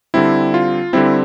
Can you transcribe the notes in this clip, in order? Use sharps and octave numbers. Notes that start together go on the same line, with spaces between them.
D3 G3 C4 E4
F4
D3 G3 C4 E4